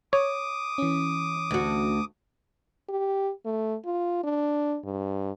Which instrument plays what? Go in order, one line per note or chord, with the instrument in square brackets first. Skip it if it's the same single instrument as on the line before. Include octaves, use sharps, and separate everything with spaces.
[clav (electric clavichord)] C#5 [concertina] D6 D#6
[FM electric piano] E3 C#4
[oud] D2 F#4
[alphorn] G4
A3
F4
D4
G2